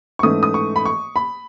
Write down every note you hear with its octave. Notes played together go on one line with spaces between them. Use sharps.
C#6
G#2 E3 A3 C#4 D#6
D#6
C#6
B5
C#6
B5